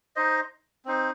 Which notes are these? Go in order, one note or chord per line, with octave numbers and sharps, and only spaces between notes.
D#4 C5 D#5
C4 D#4 C5